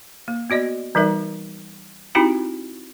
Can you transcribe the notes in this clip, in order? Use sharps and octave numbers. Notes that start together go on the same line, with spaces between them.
A#3
B3 F#4 D5 D#5
E3 G3 D#4 A#4 E5
C4 D#4 E4 F#4 G4 B5